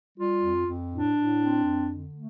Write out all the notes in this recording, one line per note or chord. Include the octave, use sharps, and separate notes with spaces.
G3 F4
F2
F2
A2 D4
A2
C4
F2
D3
A3